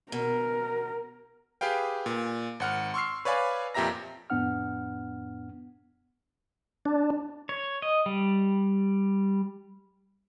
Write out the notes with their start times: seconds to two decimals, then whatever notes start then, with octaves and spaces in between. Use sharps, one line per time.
0.12 B2 A#4
1.61 G4 G#4 B4 F5 G5
2.06 A#2
2.60 G#1 F#5 F6
2.94 C6 C#6 E6 F6 C7
3.25 B4 C#5 D5 F5 G#5 B5
3.74 F2 A#2 G4 E5 A#5 A#6
4.30 F2 A2 B3 D4 F#5 F6
6.85 D4
7.49 C#5
7.82 D#5
8.06 G3